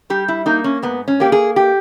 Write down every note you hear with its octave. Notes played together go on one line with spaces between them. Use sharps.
G3 G4
E4
A#3 D#4
C#4
G#2 B3
C#4
A#3 G4
G#4
G4